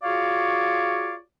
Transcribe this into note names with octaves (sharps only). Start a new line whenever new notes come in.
F4 F#4 G#4 C#5 D5 F5